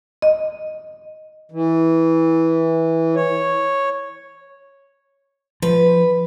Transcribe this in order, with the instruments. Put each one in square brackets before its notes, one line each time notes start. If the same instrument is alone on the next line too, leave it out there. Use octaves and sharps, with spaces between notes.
[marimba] D#5
[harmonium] E3
C#5
[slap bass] F3 [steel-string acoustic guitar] B4